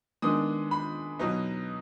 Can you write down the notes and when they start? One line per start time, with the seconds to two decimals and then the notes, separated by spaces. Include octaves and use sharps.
0.22 D#3 G#3 B3 D4 D#6
0.71 B5
1.19 B2 F#3 B3 D#4